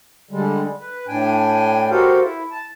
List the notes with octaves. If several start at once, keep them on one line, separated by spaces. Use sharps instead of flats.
D3 G3 G#3
B4
A2 D4 G5 G#5
F#4 G4 A4 A#4 C5 F5
E4
A5